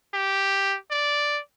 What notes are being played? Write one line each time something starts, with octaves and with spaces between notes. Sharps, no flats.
G4
D5